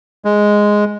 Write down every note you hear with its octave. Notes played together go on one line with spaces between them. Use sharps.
G#3